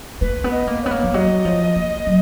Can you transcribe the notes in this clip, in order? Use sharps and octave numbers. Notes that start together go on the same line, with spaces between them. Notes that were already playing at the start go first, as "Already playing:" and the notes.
A#3 B4
B3
D#5
A#3
B3 C#5
A#3
F3
F#3 D#5
F3
A#3
F#3